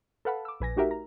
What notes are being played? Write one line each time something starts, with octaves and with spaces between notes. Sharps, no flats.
A4 B4 F5 F#5 A5 B5
D6 E6
A#1 B4 G#5 A#6
A3 D#4 F#4 G4 A#4 E5
A#5